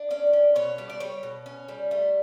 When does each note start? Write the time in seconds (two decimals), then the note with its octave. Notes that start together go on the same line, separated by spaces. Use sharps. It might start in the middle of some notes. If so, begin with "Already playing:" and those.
Already playing: D4
0.10 C#4 D5
0.33 C#4
0.55 B2 C#5
0.78 G3
0.89 D5
1.00 G3 C#5
1.23 B2
1.46 C#4
1.68 G3
1.91 A3